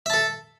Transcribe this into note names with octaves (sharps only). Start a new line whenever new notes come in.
A4 E5 A5